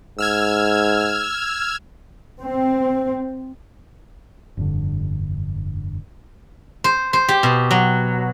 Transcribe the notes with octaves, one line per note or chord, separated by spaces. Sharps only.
G#2 E6 F6 G#6
C4
F1 G2 D3
C5
C5
G4
B2
F#3